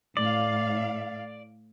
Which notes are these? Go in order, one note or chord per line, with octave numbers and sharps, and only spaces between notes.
A2 D5 F5